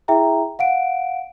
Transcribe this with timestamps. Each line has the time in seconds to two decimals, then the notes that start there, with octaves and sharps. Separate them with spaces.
0.08 E4 G#4 E5 G5 A#5
0.59 F5 F#5 D7